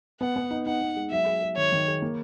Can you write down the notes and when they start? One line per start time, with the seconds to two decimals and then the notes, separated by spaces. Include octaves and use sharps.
0.21 B3 F#5
0.36 B3
0.51 D#4
0.66 D#4 F#5
0.81 B3
0.96 G#3
1.11 F#3 E5
1.26 G#4
1.42 G#4
1.57 D#3 C#5
1.72 D#3
1.88 G#4
2.02 A#3